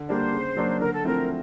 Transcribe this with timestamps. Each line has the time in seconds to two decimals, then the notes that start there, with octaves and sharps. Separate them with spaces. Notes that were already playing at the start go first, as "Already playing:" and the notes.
Already playing: D3
0.08 G3 A#3 D4 C5
0.32 C#3
0.56 F#3 A#3 D4
0.80 D3 A#4
0.93 A4
1.04 F3 A3 C4 E4 A#4